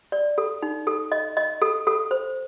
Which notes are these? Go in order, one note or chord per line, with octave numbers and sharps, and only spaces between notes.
D5
A4
D#4
A4
D#5
D#5
A4
A4
C5